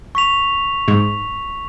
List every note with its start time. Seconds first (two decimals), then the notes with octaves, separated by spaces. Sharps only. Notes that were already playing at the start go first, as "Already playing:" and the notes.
0.15 C#6 B6 F7
0.88 G#2